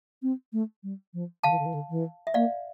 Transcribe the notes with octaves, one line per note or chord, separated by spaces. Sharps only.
C4
A3
G3
F3
D3 F5 A5
E3
D3
E3
D3
E3
E5
A#3 D5 F5